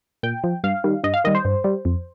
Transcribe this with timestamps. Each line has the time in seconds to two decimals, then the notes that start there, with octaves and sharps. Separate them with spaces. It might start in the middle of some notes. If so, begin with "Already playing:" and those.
0.23 A#2 G5
0.44 F3
0.64 G2 F5
0.84 D#3 G3
1.04 G2 D#5
1.14 F5
1.24 D#3 G3 D#5
1.35 C5
1.45 G2
1.64 G3
1.85 F2